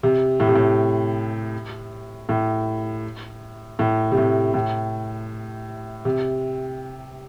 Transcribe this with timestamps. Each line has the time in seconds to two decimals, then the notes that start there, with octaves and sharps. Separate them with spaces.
0.03 C3
0.40 A2
0.47 C3
0.55 A2
2.29 A2
3.79 A2
4.11 C3
4.17 A2
4.54 A2
6.05 C3